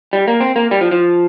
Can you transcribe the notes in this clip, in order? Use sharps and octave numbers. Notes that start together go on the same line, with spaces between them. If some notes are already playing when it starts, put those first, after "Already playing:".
G3
A#3
C4
A#3
G3
F3
F3